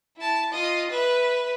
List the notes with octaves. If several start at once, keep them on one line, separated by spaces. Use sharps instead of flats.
E4 A5
F4 D#5
B4 E5